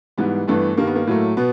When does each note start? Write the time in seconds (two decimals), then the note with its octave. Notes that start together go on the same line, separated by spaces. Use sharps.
0.18 G#2 E3 G3 B3
0.47 G2 E3 A3 B3
0.77 G2 D#3 G3 A#3
0.87 B3
0.96 A#3
1.07 A2 F#3 A3
1.37 B2 B3